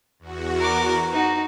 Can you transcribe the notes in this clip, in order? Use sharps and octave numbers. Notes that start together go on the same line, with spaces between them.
E2 F#4
A#4 D6
D#4 F#4